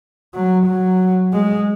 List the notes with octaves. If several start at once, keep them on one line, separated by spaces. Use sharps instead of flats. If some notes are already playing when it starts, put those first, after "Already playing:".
F#3
F#3
G#3